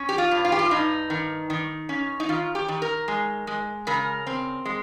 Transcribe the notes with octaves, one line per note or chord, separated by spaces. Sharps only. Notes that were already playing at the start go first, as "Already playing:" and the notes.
Already playing: C#4
G4
F4
G2
F4
G4
F4
G2 D#4
D#3
D#3
C#4
D#4
D#3 F4
G4
D#3
A#4
G#3
G#3
C#3 A#4
C4
G#3